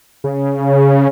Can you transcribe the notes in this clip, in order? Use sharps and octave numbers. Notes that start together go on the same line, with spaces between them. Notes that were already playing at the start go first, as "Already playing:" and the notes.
C#3